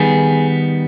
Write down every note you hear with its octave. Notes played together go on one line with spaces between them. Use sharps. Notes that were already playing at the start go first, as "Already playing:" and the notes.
Already playing: D#3 G3 B3 G#4